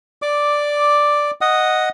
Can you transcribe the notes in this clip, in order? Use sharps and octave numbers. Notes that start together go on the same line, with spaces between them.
D5 D6
D#5 F#5 D#6